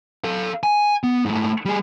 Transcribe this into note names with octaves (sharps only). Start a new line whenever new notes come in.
A4 F5
G#5
B3
G#2 A3
G3 G#4